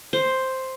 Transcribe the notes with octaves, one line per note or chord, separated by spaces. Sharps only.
C5